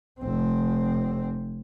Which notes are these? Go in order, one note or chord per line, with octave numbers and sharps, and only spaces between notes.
F1 C4